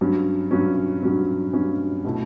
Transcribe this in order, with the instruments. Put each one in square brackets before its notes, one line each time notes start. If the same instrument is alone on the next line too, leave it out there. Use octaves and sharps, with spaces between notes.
[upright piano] G2 F#3 C#4
G2 F#3 C#4
G2 F#3 C#4
G2 F#3 C#4
B2 A3 E4